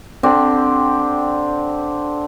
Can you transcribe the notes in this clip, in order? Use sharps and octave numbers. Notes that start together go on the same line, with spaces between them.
D3 C4 D4 G4